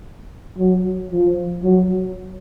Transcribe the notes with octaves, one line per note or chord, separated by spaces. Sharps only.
F#3
F3
F#3